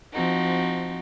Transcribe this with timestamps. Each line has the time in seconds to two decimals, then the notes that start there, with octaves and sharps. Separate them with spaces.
0.12 F3 C4 D#4 F#4